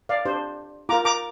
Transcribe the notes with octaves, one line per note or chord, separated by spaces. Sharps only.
D5 F5
D4 G4 C5
F4 A#4 A#5 D6
A#5 D6